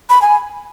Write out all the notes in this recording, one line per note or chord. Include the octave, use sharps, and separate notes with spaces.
B5
G#5